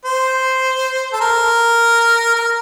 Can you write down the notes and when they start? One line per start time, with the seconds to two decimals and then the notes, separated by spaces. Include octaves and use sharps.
0.05 C5
1.13 A4
1.21 A#4
2.35 A#4